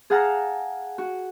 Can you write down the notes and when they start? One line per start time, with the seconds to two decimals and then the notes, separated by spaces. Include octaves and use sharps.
0.10 G#4 F5 F#5 A5 A#5 F6
0.98 F#4